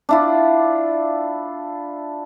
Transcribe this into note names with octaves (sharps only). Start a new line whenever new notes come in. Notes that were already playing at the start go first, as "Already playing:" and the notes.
D4 E4 F4